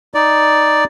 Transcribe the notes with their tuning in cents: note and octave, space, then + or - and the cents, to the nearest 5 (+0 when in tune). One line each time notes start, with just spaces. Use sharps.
D#4 +0 D5 +0